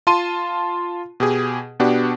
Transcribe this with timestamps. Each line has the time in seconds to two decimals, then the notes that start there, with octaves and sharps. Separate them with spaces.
0.07 F4 A5 C6 D#7
1.20 B2 G4 G#4
1.80 B2 B3 D4 F#4 G4